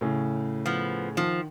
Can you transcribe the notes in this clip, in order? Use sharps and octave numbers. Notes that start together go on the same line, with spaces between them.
A2 C#3
F3 B3
D#3 F3